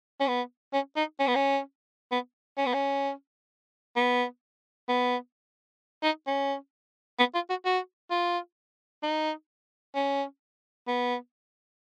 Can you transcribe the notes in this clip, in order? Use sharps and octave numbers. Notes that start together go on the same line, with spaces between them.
C#4
B3
C#4
D#4
C#4
B3
C#4
B3
C#4
B3
C#4
B3
B3
D#4
C#4
B3
F4
F#4
F#4
F4
D#4
C#4
B3